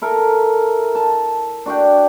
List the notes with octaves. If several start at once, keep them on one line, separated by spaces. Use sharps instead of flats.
E4 A4 A#4
A5
D4 F#4 D5 G5